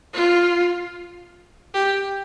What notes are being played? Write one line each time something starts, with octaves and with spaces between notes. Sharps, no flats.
F4
G4